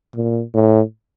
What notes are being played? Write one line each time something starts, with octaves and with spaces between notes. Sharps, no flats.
A#2
A2